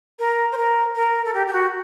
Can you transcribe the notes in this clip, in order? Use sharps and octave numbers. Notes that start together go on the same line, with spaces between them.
A#4
C5
A#4
A#4
A4
G4
G4
F#4